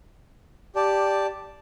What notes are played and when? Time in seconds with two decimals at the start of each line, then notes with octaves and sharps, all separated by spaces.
0.75 G4 D5 A5